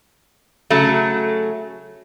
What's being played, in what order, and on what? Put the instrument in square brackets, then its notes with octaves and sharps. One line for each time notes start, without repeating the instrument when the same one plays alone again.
[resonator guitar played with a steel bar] C#3 F#3 A3